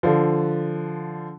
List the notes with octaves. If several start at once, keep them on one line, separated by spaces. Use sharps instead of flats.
D3 F3